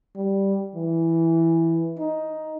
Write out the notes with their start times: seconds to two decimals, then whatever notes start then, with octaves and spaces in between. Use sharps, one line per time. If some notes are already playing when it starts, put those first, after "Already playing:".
0.16 G3
0.75 E3
1.99 D#4